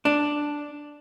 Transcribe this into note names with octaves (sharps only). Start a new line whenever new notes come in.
D4